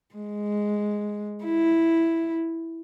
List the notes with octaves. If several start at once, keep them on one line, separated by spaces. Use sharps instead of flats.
G#3
E4